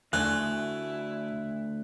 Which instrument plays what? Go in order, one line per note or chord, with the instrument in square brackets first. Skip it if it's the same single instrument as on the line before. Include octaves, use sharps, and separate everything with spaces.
[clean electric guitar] D2 [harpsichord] A3 G#5 [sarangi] E4 [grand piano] F#6